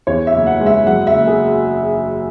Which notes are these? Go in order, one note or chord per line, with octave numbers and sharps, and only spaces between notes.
E2 C#5
E5
F#1
F#5
G#3
E5
F#2 F#5
E5
F#1
G#4